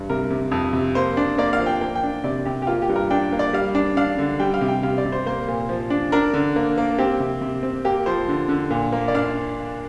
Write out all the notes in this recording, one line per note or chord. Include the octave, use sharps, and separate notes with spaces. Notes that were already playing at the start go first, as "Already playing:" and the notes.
Already playing: G2
C3 A#4
C3
F2
C3
A#3 C5
D4
A#3 D5
F5
F3
G5
A#3 G5
G5
D4
C3 D5
C3 G4
G4
A#3 F4
G4
G2
A#4
D4 G5
A#3
D5
G3 F5
D4
D4 F5
D3
G3 G5
F5
C3
G5
C3 F5
D5
C3
C5
A#3 C5
A#2
F3
D4
D4 A#4
D3
A#3
A#3
C4 G4
C3
C3
C4
A#3 G4
F3 C5
D3
D3
A#2
A#3
D5
D4 F5